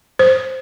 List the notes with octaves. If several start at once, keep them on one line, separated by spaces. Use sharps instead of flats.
C5